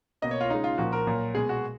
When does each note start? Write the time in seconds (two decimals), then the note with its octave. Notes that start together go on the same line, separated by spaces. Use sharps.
0.22 B2 A#3 D#5
0.31 C#5
0.41 F4
0.50 C#3 G#3 D#4
0.64 F4
0.78 A#2 F3 A#3 F#4
0.93 A#4
1.07 A#2 F#3 A#3
1.35 B2 G#3 G#4
1.49 F#4